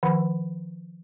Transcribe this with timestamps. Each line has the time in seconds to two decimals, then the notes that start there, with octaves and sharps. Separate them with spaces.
0.03 D#3 F3 F#5 B5